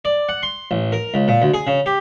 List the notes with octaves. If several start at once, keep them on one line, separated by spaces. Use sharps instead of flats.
D5
F#5
C6
A1
A#4
C#2
A#2
D2
G#4
C#3
G4